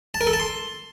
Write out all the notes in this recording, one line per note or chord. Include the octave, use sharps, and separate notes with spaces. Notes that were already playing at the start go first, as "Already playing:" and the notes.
A5
A#4
A4
A5
C6